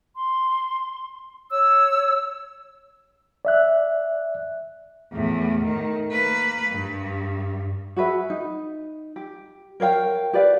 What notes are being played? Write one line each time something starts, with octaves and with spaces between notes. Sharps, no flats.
C6
C#5 E6
D5 E5 F#6
E2 A2
A2 D#3
A#3 B4
G2
F#4 G#4 B4 E5
D#4
G4
A#4 C#5 F5 G5
G4 B4 D5 F5